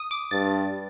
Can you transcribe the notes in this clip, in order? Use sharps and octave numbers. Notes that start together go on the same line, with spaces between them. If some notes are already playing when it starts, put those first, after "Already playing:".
Already playing: D#6
D6
G2 A6